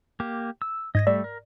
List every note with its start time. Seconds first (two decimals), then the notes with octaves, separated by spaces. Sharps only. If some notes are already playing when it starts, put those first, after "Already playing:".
0.20 A#3 G4
0.62 E6
0.95 G#2 D#5 G#6 A#6
1.07 G3 A3 D5 E5
1.24 A#4